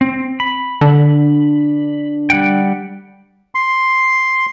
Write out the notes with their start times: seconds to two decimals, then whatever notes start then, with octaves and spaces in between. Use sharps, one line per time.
0.01 C4
0.40 B5
0.81 D3
2.30 G3 F#5 G5
3.55 C6